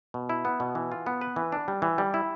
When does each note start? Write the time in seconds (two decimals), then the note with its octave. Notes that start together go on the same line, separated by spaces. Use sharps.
0.14 B2
0.29 E4
0.45 B3
0.60 B2
0.75 E3
0.92 F4
1.06 B3
1.21 B4
1.36 E3
1.52 D4
1.68 G3
1.82 E3
1.98 G3
2.14 E4